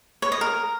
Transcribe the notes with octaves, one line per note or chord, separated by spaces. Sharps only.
C#5
D#5
A#4